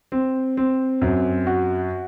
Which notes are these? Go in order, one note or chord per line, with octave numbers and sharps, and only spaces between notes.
C4
C4
F#2
F#4